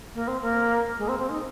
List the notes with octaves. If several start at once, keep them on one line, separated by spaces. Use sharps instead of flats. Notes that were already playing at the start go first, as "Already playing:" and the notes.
A#3
C4
A#3
G#3
C4
C4
D#4